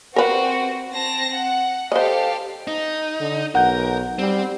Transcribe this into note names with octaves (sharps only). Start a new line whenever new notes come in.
C4 F#4 A#4 B4
C4 A5 A#6
F#5
G4 A4 C5 D#5 F5
D#4
D3
B1 A#4 F#5 G6
G3 C4